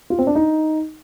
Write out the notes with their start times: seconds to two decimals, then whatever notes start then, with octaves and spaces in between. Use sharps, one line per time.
0.10 F4
0.19 C4
0.27 D4
0.35 D#4